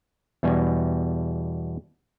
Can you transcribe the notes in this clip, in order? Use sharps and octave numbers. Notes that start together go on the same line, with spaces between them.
E2 B2 G3 G#5